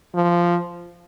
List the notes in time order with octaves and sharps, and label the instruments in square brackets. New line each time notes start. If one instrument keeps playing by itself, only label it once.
[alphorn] F3